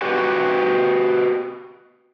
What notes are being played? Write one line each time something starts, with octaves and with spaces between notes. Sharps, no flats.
F#4 G4 B4